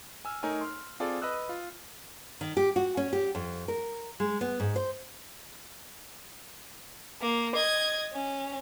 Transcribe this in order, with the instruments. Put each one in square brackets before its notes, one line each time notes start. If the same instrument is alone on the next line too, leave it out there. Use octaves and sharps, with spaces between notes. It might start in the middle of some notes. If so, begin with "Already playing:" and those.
[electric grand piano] G#5 E6 F6
A3 D#4 A#4 C#5 G#5
C6 F6
C4 F4 G#4 A4 D5
B4 D#5 D#6 E6 F#6
F4
[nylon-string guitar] D#3
G4
F#4
C#4
G4
F2
A#4
G#3
B3
G#2
C5
[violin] A#3
D#5 G#6
C#4